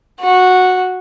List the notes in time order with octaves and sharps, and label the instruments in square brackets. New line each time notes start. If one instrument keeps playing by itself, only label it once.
[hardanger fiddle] F#4